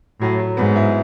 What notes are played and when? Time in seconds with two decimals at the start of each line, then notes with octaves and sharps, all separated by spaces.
0.21 A2 F#3
0.39 F#3
0.57 G#2 B3
0.76 E4